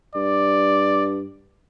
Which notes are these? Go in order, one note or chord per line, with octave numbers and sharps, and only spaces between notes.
G2 D5